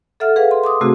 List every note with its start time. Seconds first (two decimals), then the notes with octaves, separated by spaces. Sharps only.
0.20 A4 E5 F#5 F6
0.36 G#4 B4 F5 F#5
0.51 C6
0.64 C6 D6 D#6
0.81 C3 A3 C4 F#4 G#4